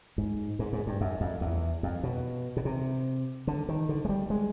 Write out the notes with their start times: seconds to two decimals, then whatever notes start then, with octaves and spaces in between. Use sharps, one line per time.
0.18 G#2
0.59 G#2
0.73 G#2
0.87 G2
1.01 F#2
1.21 F2
1.41 E2
1.83 F2
2.03 B2
2.57 B2
2.65 C3
3.47 D3
3.68 D#3
3.89 D3
4.05 G#3
4.09 G3
4.30 G#3